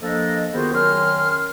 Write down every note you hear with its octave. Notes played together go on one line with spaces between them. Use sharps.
F3 A#3 D4 A4 D#5
D#3 B3 F4 F#4 G#4 C5
D#3 F#3 C#4 A#4 C6 F6